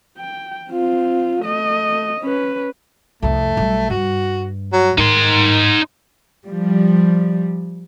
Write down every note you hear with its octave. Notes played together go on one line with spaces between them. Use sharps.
G5
C4 F4
A3 D#5
C#4 B4
C2 F2 A3
B1 G3
G2 F#4
F#3
G#2 D#3 D#4 C6
F3 G3